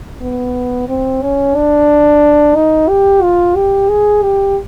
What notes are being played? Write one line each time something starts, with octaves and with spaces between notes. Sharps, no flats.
B3
C4
C#4
D4
D#4
G4
F4
G4
G#4
G4